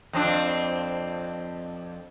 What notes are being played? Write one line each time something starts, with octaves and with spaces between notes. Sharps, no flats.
F2 C4 D4